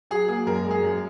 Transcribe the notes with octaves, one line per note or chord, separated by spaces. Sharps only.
F#3 G#4
A#3 G#4
F#2 A#4
G#3
G#4
F#2